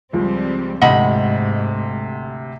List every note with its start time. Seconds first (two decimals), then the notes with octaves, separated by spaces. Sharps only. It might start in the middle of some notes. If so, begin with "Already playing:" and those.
0.13 C#2 F3 G3 C4
0.81 A1 D2 G#2 C3 G#3 D#5 F#5 B5